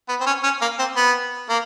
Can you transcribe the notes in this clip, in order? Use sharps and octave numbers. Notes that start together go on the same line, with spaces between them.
B3
C4
C#4
C#4
A#3
C4
B3
A#3